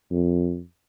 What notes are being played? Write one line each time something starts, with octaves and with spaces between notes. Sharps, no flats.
F2